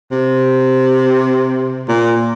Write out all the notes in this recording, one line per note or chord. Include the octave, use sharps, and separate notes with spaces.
C3
A#2